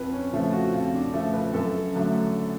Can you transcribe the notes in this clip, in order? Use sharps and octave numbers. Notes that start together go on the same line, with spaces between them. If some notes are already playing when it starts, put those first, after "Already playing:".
Already playing: F2 B4
C#4
C#3 F3 A3
F#4
F2 F4
D4
C#3 F3 A3
B4
F#2 A4
D3 F#3 A3